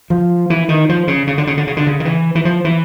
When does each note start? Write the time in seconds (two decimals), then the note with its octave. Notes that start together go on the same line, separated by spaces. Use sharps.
0.10 F3
0.50 E3
0.69 D#3
0.89 F3
1.08 C#3
1.27 C#3
1.38 D3
1.47 C#3
1.57 D3
1.67 C#3
1.77 D3
1.87 C#3
2.00 D#3
2.05 E3
2.35 E3
2.45 F3
2.65 E3